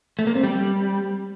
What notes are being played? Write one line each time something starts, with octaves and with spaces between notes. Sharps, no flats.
A3
A#3
C4
G3